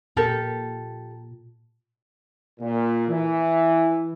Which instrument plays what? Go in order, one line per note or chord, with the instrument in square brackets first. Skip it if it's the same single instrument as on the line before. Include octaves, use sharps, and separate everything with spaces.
[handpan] A#2 [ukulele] G4 A4 A#4
[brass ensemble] A#2
E3